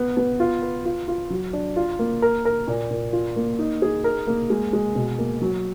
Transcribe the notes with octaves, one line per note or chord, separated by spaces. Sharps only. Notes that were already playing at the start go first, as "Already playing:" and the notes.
Already playing: B3
B3
F4
B4
F4
F4
F#3
D4
F4
A#3
A#4
A#4
A#2
A#2
F4
A#3
D#4
G#4
A#4
A#3
G#3
G#3
B2
A#3
F#3